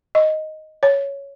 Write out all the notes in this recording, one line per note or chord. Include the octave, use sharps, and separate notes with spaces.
D#5
C#5